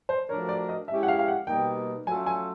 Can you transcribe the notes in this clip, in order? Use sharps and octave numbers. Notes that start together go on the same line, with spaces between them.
C5
F3 A3 D4 F#4 A#4 C#5
D5
D#5
G#3 C#4 E4 G4 E5
F#5
F5
F5
F#5
B2 G3 A#3 D#4 G5
F#3 A3 C#4 F4 A4 G#5
G#5